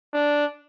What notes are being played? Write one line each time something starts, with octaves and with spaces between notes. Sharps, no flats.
D4